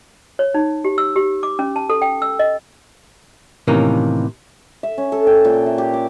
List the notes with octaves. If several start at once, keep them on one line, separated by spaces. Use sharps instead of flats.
C#5
D#4
G4
E6
G4
D6
C#4
A5
A4
G5
E6
D#5
A2 C3 D#3 E3 A#3 C#4
E5
C#4
A4
G5
A#2
E5
G4
D6